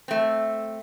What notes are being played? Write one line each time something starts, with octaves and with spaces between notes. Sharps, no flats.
A3 C4